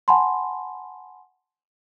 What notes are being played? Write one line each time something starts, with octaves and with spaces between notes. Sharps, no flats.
F#5 G#5 A5 B5 C6